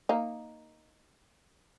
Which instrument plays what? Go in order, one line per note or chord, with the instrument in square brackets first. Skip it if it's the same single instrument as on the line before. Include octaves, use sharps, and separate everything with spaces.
[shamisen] A#3 D#4